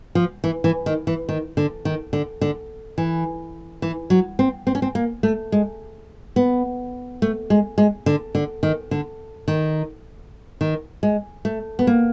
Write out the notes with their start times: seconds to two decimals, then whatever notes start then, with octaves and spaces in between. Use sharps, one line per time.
0.15 F3
0.44 E3
0.64 E3
0.86 D#3
1.07 E3
1.29 D#3
1.57 D3
1.85 D#3
2.13 D3
2.41 D3
2.98 E3
3.82 E3
4.10 F#3
4.39 C4
4.67 C4
4.75 C#4
4.82 C4
4.95 A#3
5.23 A3
5.52 G#3
6.36 B3
7.22 A3
7.50 G#3
7.78 G#3
8.06 D3
8.35 D3
8.63 D#3
8.91 D3
9.48 D#3
10.61 D#3
11.03 G#3
11.45 A3
11.79 B3
11.87 A#3